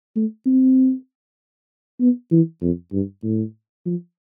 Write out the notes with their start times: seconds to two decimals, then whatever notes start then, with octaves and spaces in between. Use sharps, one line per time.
0.16 A3
0.46 C4
2.00 B3
2.31 E3
2.62 F2
2.93 G2
3.23 A2
3.86 F3